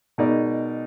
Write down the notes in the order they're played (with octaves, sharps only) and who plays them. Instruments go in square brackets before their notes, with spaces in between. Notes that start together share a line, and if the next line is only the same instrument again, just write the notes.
[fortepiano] B2 G#3 D#4 A#4 D5